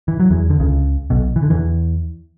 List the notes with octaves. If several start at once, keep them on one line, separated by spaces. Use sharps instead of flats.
E3
F#3
E2 E3
D3
C#2 C#3
B1 B2
E3
D3
E2 E3